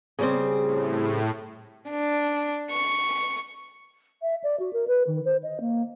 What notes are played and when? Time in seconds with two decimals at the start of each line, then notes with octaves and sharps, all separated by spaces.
0.19 C#3 G3 C4 G#4
0.58 A2
1.90 D4
2.71 C#6
4.22 E5
4.44 D5
4.60 F#4
4.73 A#4
4.88 B4
5.07 D#3
5.25 C5
5.43 D#5
5.61 A#3